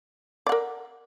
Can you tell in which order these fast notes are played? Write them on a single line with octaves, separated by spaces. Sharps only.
D5 F#5 A#4